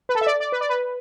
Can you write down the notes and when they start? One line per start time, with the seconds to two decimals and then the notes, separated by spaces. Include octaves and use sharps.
0.09 B4
0.15 A4
0.21 E5
0.27 D5
0.40 D5
0.52 B4
0.61 D5
0.69 B4